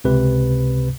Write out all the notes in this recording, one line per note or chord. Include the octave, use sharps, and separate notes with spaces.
C#2 C3 B4